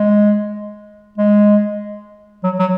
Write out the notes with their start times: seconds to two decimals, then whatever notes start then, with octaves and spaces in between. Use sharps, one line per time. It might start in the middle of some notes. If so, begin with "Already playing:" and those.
Already playing: G#3
1.18 G#3
2.43 F#3
2.59 F#3